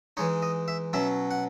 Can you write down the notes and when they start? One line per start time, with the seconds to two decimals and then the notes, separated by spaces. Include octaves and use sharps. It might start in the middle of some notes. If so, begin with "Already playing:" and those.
0.17 E3 G#3 D#4 C#5
0.42 D#5
0.68 E5
0.93 B2 F#3 C#4 E4 E5
1.31 F#5